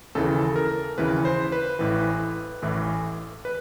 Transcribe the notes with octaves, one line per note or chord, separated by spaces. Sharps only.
D#2 C#3 E3 A4
A#4
D#2 C#3 E3 B4
C5
B4
A1 A2 E3
A1 A2 E3
B4